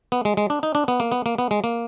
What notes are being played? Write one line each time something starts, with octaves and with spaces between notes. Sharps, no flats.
B3
G#3
G#3
D4
D#4
D4
B3
A#3
B3
A#3
B3
G#3
A#3